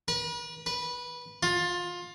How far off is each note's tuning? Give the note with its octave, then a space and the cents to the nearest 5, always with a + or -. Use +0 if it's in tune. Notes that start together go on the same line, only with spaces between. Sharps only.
B4 -40
B4 -15
F4 +20